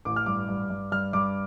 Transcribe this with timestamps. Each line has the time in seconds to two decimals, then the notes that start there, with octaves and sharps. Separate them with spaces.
0.05 A1 D6
0.16 F6
0.26 G2 D6
0.49 G2
0.70 G2
0.92 G2 F6
1.13 G2 D6